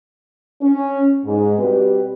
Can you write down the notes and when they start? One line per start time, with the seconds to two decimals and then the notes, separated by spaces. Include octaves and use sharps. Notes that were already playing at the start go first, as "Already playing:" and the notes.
0.62 C#4
1.25 G#2
1.58 B2 G3 C4 G4 B4